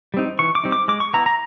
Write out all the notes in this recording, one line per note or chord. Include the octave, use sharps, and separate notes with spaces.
G3 C4 D#4
E3 C#6
D6
G3 C4 D#4
D6
G#3 D6
C#6
B3 E4 A#5
A#5